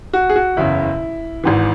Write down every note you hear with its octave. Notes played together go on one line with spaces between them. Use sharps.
F#4
G#4
F#4
F#1 E2 C#3 E4
G#1 G#2 E3